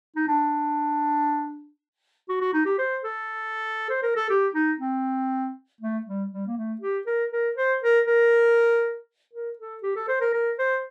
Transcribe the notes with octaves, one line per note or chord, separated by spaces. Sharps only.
D#4
D4
F#4
F#4
D#4
G4
C5
A4
C5
A#4
A4
G4
D#4
C4
A3
G3
G3
A#3
A3
G4
A#4
A#4
C5
A#4
A#4
A#4
A4
G4
A4
C5
A#4
A#4
C5